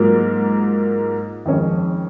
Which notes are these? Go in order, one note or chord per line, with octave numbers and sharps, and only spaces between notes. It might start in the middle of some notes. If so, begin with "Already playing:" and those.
Already playing: G#2 F#3 A#3 F4 A#4
F2 D#3 G#3 C#4